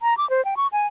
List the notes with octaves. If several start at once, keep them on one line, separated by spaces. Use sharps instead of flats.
A#5
D6
C5
G5
C#6
G#5